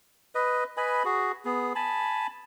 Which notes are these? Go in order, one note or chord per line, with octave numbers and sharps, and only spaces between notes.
B4 D#5
B4 D#5 G#5 B5
F#4 G#4
B3 G#4
G#5 A5 B5